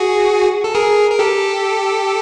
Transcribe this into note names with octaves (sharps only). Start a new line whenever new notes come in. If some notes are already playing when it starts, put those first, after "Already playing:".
Already playing: F#4 G#4
A4
G#4 A#4
A#4
G4 A4